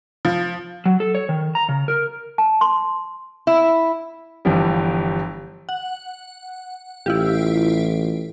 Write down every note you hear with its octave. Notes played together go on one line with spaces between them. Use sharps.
F3
F#3
A4
C#5
D#3
A#5
C#3
A#4
A5
C6
E4
G1 D3 E3 F3 G3
F#5
A1 E4 F4 G4